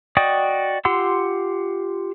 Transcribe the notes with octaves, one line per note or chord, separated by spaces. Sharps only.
F#4 D5 D#5 G5 D#6
F4 G4 F#5 C6 E6